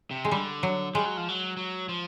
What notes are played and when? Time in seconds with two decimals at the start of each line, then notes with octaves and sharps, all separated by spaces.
0.11 C3
0.25 G#3
0.31 D3 G3
0.63 F#3
0.95 G3 G#3
1.06 F#3
1.17 F3
1.28 F#3
1.57 F#3
1.89 F3